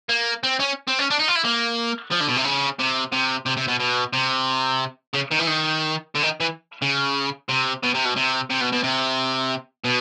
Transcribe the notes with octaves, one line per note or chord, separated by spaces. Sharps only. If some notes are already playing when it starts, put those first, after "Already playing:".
A#3
C4
C#4
C4
C#4
D4
D#4
F4
E4
A#3
F3
D3
B2
C3
C#3
C3
C3
C3
C3
B2
B2
C3
C#3
D#3
E3
D#3
D3
D#3
E3
C#3
C3
B2
C3
B2
C3
C3
B2
B2
C3
B2